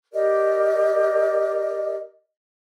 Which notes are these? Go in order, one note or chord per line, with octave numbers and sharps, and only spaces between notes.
G4 A#4 D5 D#5